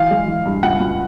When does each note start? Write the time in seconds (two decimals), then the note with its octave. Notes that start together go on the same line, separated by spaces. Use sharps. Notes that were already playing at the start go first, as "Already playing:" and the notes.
Already playing: E3 F5
0.11 G#3
0.28 E3
0.45 G2
0.63 C#2 F#5
0.80 C#2